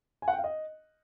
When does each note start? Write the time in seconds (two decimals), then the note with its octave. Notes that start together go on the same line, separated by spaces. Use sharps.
0.22 G#5
0.28 F#5
0.33 G5
0.38 F5
0.44 D#5